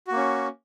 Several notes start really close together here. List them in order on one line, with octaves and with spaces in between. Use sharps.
F#4 A#3 C#4